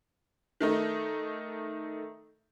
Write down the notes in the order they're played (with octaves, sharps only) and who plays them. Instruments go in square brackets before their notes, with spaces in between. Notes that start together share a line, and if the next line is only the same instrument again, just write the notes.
[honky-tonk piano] D#3 A3 D#4